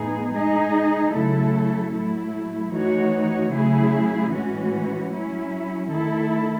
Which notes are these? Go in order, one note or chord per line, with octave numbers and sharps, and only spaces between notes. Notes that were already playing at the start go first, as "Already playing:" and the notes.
Already playing: A2 E3 B3 D#4 G#4
G#3 D#4 G#4 D#5
C#3 F#3 A3 E4 A4
A2 F#3 A3 E4
E3 A3 D#4 F#4 C#5
C#3 F#3 A3 E4 G#4
A2 E3 G#3 C#4 F#4
F#3 C#4 E4
D#3 A3 E4 A4